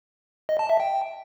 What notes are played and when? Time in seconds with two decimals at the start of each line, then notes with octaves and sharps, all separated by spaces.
0.49 D#5
0.59 A5
0.70 E5
0.80 G5